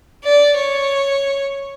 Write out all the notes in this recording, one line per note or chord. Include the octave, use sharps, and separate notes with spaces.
D5
C#5